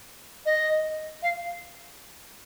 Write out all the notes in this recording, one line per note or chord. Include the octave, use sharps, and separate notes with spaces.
D#5
F5